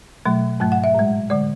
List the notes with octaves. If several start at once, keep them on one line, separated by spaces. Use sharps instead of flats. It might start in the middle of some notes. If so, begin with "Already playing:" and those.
B2 F#3 A3
G#2 F#3 A3
F#5
E5
A2 G#3
D3 G#3 D5